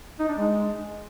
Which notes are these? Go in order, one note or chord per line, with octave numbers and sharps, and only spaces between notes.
D#4
D4
G#3